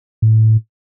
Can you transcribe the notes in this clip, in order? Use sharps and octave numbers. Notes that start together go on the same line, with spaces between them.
A2